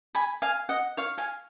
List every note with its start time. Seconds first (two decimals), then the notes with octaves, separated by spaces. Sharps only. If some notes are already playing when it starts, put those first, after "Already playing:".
0.15 G#5 B5
0.42 F5 G#5
0.69 D#5 F#5
0.97 C#5 F5
1.18 F5 G#5